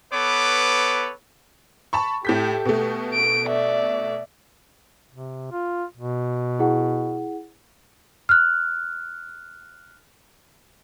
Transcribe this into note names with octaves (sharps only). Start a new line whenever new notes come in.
B3 A4 B4 C#5 D6
A5 B5 C#6
A2 G4 A4 G6 B6
B2 A3
D7
D5 E5
C3
F4
B2
E4 G#4 F#5
F6 F#6